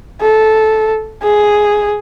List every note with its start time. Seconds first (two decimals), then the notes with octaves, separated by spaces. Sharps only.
0.21 A4
1.23 G#4